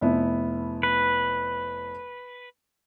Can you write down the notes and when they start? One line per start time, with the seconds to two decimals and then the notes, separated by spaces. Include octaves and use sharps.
0.01 F1 B3 E4
0.83 B4